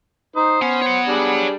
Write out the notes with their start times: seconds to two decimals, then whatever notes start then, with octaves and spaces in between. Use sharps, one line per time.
0.36 D#4 C5
0.61 B3 C#4
0.82 C#5 F#5
1.08 G3 D4 G#4